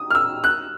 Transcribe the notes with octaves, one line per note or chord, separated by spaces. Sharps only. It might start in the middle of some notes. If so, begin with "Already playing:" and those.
Already playing: D#6
F6
E6
F#6